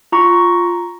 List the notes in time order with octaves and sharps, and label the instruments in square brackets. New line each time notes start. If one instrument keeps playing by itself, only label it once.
[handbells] F4 A#5 C#6